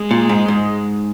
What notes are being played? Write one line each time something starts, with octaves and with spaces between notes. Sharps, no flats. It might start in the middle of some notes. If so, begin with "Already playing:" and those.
Already playing: G#3
A#2
G#2
G#2